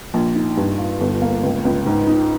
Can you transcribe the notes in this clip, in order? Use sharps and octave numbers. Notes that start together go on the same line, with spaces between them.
A#1
D#4
G2
F4
G1
A#3
C#2
C#2
G#2
D#4